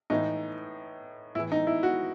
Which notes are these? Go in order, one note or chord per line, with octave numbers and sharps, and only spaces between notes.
A2 E3 D#4
A2 E3 E4
D#4
E4
F#4